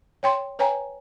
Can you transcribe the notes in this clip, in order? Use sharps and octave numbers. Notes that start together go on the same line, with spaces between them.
C#5 G5 C6
B4 C#5 G5 G#5 A#5